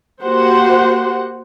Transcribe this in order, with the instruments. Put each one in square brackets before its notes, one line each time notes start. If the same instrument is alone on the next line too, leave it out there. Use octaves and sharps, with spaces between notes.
[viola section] A#3 F#4 G4 C5 F#5